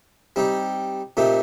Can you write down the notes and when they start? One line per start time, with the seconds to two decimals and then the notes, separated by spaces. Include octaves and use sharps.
0.36 G3 C4 D#4 G4
1.17 A#2 A3 C4 D#4 G4